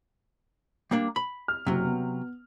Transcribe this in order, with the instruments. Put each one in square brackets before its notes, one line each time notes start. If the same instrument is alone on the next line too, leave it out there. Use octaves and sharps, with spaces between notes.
[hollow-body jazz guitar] G3 A#3 D4
B5
[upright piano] F6
[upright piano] F#1 [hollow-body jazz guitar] C3 F#3
[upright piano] B3